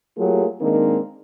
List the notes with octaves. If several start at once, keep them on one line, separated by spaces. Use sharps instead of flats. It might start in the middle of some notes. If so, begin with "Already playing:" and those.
F#3 A3 A#3 F4 G4 G#4
D#3 G#3 A#3 C4 D4 D#4